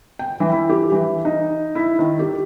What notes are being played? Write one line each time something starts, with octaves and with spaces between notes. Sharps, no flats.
G5
E3
E4
G4
E3
D#4
E4
D#3
G4